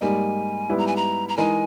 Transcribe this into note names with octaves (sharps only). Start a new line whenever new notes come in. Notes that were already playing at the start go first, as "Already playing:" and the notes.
G#2 G3 A#3 D#4 G#5
G#2 G3 B3 E4
A#5
G#5
A#5
A#5
E3 G#3 D#4 A#4 G#5